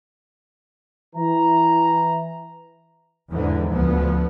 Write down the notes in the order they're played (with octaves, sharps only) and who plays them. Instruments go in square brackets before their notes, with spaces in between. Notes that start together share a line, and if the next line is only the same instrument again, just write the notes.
[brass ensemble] E3 A#5
[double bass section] E2 G#2 D3 E3
D2 F3 B3